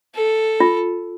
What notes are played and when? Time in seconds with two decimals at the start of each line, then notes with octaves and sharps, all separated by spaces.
0.15 A4
0.60 F4